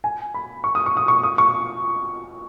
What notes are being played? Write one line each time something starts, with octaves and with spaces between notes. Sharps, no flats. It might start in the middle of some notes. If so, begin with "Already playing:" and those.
G#5
B5
C#6
D#6
C#6
D#6
C#6
D#6
C#6